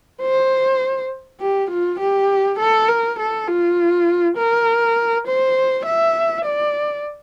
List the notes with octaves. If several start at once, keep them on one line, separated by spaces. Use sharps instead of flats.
C5
G4
F4
G4
A4
A#4
A4
F4
A#4
C5
E5
D5